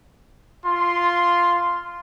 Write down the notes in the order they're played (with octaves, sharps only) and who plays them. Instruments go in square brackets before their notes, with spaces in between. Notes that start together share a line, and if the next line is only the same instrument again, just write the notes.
[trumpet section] F4 C6